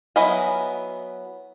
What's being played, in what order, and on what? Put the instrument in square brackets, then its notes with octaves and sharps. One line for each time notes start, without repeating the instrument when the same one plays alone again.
[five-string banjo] F#3 B3 E4 D#5 G#5